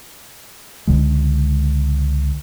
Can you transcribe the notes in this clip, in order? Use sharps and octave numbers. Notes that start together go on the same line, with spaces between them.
C#2 D3 G#3